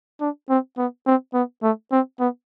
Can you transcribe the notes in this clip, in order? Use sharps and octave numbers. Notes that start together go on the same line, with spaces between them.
D4
C4
B3
C4
B3
A3
C4
B3